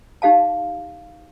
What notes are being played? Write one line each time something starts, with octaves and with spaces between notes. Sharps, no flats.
D#4 G4 F5 A5